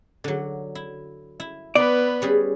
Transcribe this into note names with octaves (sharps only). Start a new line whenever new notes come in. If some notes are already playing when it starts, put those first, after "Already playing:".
D3 F#3
E4
E4
B3 B4 D5
G3 C#4 G#4